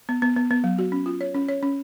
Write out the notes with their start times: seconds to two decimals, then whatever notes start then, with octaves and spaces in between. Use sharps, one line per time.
0.09 B3
0.22 B3
0.36 B3
0.51 B3
0.64 F#3
0.79 F#4
0.92 C#4
1.06 F4
1.21 C#5
1.35 C#4
1.49 C#5
1.63 C#4